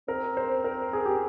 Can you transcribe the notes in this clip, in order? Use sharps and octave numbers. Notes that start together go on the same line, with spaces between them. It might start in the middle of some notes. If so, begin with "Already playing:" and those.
C4 A#4
C5
A#4
G#4
G4